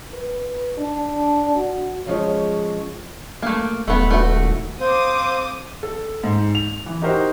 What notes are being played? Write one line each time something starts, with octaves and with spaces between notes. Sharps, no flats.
B4
D4
F#4
C#3 F3 G#3 C#5
A3 A#3
D#1 A3 B3
A3 F#4
C4 C5 F5 D6 D#6
A4
G#2
F7
E3
D#4 E4 F#4 G4 A#4 C5